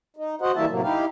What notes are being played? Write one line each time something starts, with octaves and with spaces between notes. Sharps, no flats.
D#4
F#4 C5 D#5 F#5
E3 G3 A#3 E4 E5 A5
A2 C3 F#3 A#3
D#4 E4 G4 F5